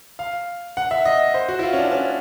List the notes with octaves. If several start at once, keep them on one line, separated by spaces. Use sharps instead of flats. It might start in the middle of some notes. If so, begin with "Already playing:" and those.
F5
F#5
E5
D#5
C5
F#4
E4
F4
C#4
D4
C#4